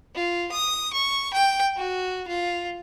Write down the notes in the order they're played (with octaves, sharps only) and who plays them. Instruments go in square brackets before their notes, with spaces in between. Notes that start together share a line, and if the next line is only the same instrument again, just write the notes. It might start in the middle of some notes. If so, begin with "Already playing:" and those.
[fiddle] F4
D#6
C#6
G5
F#4
F4